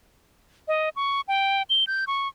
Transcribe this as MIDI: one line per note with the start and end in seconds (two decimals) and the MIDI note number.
0.68 0.89 75
0.96 1.21 85
1.28 1.63 79
1.70 1.84 103
1.87 2.05 91
2.07 2.28 85